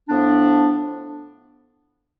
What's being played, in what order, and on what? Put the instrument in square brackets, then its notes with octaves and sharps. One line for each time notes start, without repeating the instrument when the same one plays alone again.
[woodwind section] A2 F3 B3 D4